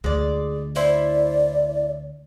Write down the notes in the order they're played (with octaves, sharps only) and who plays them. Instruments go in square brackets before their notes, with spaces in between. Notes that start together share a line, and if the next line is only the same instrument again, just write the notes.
[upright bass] D2 F4 [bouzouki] G#3 D5
[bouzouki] E4 C5 E5 [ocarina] D5